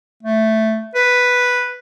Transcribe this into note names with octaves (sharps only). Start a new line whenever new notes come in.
A3
B4